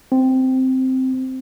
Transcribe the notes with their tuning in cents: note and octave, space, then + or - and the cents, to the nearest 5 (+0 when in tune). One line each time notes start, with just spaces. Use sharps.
C4 -5